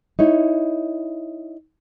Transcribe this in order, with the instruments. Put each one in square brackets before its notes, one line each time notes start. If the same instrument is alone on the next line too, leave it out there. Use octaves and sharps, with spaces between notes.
[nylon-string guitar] D#4 E4 C#5